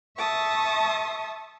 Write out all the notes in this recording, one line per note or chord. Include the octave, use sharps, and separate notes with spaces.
E5 A5 C#6 D#6